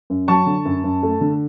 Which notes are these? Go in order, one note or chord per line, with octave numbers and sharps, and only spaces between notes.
F#2
F#3 A5 C#6
D3
F#2
F#2
A3
D3